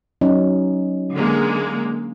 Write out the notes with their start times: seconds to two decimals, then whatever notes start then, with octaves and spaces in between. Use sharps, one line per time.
0.21 F#3 C#4 D#4
1.16 D3 G#3 A#3